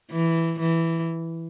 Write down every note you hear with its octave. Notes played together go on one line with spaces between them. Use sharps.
E3
E3